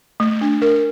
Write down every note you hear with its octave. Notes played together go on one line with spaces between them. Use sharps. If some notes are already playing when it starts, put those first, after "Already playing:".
A3
D4
A#4